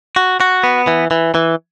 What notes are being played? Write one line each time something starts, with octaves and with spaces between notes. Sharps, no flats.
F#4
F#4
B3
E3
E3
E3